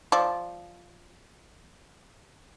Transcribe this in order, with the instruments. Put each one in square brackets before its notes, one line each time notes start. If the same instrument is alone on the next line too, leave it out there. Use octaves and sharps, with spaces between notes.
[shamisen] F3 D5